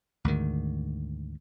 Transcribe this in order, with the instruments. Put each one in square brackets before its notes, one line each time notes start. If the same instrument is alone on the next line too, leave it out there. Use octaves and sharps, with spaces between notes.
[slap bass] D2 G#2 D#3